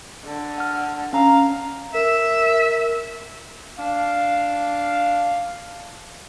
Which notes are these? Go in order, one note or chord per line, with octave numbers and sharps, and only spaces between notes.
D3
F#5 F6
C#4 F5 A#5
A#4 E5
D4 F5